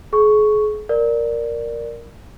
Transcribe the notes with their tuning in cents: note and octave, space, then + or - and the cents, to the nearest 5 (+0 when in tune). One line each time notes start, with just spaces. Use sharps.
G#4 +35 C#6 +0
A#4 +0 D5 +0